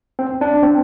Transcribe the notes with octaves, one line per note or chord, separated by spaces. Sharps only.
C4
D4
C4